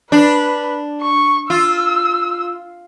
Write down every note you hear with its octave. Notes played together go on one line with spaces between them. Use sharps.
D4 B4
C#6
F4 E6